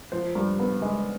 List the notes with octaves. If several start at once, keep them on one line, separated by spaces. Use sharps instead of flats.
F3 C5
G2
B3
G#3